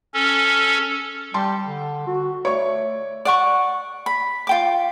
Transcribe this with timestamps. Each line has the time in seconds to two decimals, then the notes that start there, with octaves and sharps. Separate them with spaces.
0.14 C#4 A4
1.34 G3 G5 A5 C6
1.65 D3
2.07 F#4
2.45 A3 C#5 D5 C#6
3.25 D5 F#5 C#6
4.06 B5
4.47 F4 G5 D6